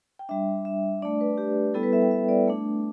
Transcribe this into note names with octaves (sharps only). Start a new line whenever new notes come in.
G5
G3 D4 E5
E5
A3 D4 D5
B4
G4
G3 B3 E4 A4
B4
E5
G5
E5
D5
A3 D4